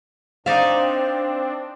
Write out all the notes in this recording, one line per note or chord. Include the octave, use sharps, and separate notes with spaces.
C4 D4 D#4 C5 D5 E5 F5